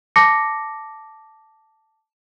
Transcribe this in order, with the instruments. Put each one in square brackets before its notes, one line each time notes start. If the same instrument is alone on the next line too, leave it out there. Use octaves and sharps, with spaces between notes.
[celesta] A5 D6 A#6 C#7